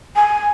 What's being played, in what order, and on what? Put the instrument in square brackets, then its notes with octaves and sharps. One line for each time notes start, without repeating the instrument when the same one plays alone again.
[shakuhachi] G#5